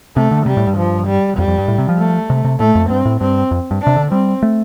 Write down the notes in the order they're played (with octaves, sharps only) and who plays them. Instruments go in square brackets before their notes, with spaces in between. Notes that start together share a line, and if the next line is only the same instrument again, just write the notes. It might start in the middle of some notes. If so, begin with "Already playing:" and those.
[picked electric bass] C3 [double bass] A3
[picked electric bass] D3
[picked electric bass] C3 [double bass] G3
[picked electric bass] A2
G2
[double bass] F3
G3
[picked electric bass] F2 [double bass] G3
[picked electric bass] F2
G2
A2
C3
F3
[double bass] A3
[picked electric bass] C3
C3
[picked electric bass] A2 [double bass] A3
[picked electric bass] F2
[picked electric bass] G2 [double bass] C4
[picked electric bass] A2
[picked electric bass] G2 [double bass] C4
[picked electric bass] F2
G2
[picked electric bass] C3 [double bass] D4
[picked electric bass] D3
[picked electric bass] G3 [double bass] C4
[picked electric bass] A3